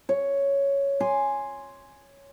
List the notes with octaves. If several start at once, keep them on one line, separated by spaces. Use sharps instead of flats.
C#5
G#5 C6 D6